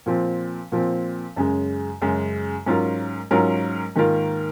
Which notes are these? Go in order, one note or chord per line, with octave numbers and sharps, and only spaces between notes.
A#2 F3 C4
A#2 F3 C4
F#2 C#3 G#3
F#2 C#3 G#3
G#2 F#3 C#4 F4 A#4
G#2 F#3 C#4 F4 A#4
G#2 D#3 A#3 F4 A#4